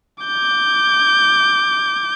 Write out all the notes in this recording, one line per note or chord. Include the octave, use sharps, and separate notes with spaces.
D6 G6